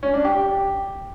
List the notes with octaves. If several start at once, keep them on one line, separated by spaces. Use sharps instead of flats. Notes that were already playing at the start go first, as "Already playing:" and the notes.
C#4
D4
G4